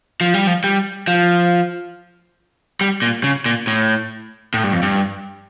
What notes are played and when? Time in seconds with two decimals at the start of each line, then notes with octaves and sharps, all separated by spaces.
0.21 F3
0.34 G3
0.47 F3
0.64 G3
1.08 F3
2.81 G3
3.02 A#2
3.24 C#3
3.46 A#2
3.67 A2
4.54 A2
4.64 G2
4.73 F2
4.83 G2